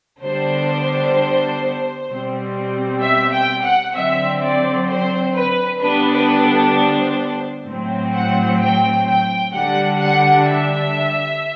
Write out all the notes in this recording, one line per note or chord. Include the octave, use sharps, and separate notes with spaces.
D3 G3 B3 D4 C5
B2 G3 C4
E5
G5
F#5
D3 F#3 C4 E5
D5
C5
B4
D3 G3 B3 D4 B4
B4
A4
C5
A2 F#3 C4
F#5
G5
G5
D3 G3 D4 F#5
F#5
E5